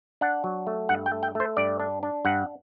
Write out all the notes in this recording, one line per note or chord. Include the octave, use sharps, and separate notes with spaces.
D4 F#5
F#3
A3
G2 F#5
G5
A3
G5
A3 C5
G2 D5
D4
D4
G2 F#5